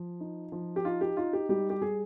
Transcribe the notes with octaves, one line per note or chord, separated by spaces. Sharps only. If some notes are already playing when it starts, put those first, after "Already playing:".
Already playing: F3
D#4
F3
G4
D#4 F4
G4
D#4 F4
G4
G3 G4
G4
G3 G#4